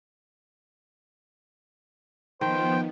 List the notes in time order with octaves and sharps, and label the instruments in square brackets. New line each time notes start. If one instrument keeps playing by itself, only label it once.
[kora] D#3 [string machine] F3 B3 [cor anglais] C5 [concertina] G5